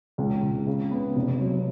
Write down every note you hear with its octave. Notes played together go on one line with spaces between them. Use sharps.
C#2
C#2
C#3
B3
F1
F#3